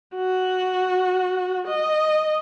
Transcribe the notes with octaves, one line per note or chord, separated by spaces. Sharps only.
F#4
D#5